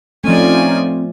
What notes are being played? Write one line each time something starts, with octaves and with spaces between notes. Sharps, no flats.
F3 A3 C4 C#4 D#4 F4 D5 G#5